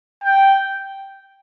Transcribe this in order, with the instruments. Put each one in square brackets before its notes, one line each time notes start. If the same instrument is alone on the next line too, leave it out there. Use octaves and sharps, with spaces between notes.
[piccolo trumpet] G5